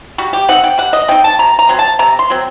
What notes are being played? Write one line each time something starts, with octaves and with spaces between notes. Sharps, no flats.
G3 F#4
G4
C4 D#4 F#5
G5
G3 F#5
D#5
C4 D#4 G5
A5
C3 A#5
A#5
F#3 C4
A5
C3 A#5
C6
F#3 C4